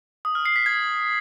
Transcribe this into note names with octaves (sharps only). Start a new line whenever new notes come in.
D#6
F6
C7
B6
G#6